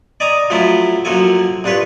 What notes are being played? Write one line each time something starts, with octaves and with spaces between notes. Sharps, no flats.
D5 D#5 G#5 A#5 D6 D#6
F3 F#3 A3 C#4 E4 F4
F#2 F3 F#3 A#3 A4 G#5
C2 D4 F4 B4 C#5